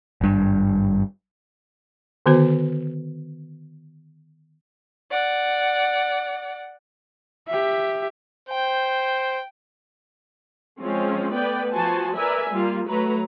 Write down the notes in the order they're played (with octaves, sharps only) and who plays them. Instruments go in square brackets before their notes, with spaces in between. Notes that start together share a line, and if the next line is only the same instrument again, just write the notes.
[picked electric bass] G#1 G2
[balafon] D3 D#3 B3 F#4 B4 C5
[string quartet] D5 F#5
[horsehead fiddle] G4 E5
[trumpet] C5 [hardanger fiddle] G5
[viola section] F3 G#3 C4 C#4 F4
A3 B3 B4 D5 G5
F3 F#4 C5 G#5 A5
A#4 B4 D5 E5 G#5
G3 A#3 F4
F#3 A3 B4 A#5